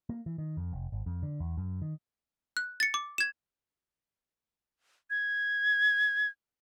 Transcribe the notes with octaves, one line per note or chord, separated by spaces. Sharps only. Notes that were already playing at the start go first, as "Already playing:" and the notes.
A#3
E3
D#3
F2
F1
G#1
F2
D3
E2
F#2
D#3
F#6
A6 C#7
D6
G#6 E7
G#6